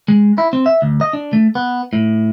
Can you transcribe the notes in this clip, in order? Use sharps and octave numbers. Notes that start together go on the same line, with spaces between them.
G#3
E4
C4
E5
D2
D#5
D4
A3
B3
A2